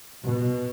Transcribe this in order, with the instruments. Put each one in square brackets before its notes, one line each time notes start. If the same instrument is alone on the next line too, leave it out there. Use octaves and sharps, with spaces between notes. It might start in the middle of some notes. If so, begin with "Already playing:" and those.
[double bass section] B2